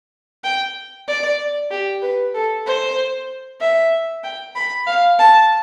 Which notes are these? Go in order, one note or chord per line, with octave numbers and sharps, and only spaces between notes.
G5
D5
G4
B4
A4
C5
E5
G5
B5
F5
A5